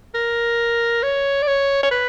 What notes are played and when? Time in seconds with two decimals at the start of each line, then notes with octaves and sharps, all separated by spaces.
0.15 A#4
1.03 C#5
1.42 D5
1.47 C#5
1.83 C#5
1.91 B4